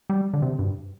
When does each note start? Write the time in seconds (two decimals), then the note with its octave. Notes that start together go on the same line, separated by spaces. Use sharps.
0.10 G3
0.34 D3
0.42 C3
0.59 G2